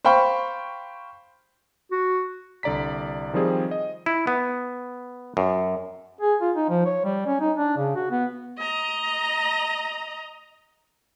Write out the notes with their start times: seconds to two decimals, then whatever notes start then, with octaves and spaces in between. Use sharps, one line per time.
0.05 C5 F5 G5 B5 C#6
1.92 F#4
2.63 C2 D3 D5 A#5 B6
3.33 D#3 F3 G3 C4 G#4
3.71 D#5
4.06 E4
4.27 B3
5.37 F#2
6.21 G#4
6.41 F4
6.56 D#4
6.69 F3
6.86 C#5
7.04 G3
7.26 C#4
7.40 D#4
7.57 D4
7.77 C#3
7.96 F#4
8.11 B3
8.58 D#5 A#5